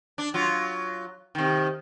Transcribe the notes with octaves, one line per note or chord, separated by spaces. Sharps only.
D4
F#3 F4
C3 D#3